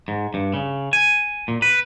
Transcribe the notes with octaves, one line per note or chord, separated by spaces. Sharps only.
G#2
G2
C#3
G#5
A#2
B4